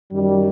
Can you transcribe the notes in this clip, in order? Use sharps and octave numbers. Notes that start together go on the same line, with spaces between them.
F#2 D#3 G3